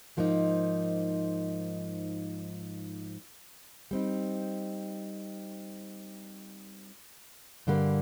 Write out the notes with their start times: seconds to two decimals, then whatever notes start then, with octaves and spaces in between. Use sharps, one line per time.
0.17 G#2 F3 A#3 D#4
3.91 G3 C4 D#4
7.67 G2 D3 G3 A#3